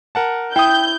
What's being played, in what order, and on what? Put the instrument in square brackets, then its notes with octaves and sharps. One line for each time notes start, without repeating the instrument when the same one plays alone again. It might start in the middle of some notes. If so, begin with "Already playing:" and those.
[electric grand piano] A#4 F#5 A5
[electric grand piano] E4 D#6 [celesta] G5 [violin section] G6